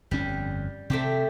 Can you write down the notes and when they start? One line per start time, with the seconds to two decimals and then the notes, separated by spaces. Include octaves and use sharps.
0.11 G1 F2 G3 C#4
0.90 C3 A3 C4 G4